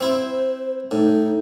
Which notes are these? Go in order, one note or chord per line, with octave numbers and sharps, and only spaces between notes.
C4 E4 C5
A2 D#4